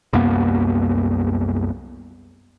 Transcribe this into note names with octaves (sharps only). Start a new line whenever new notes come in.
C2 F#2 A#3 B3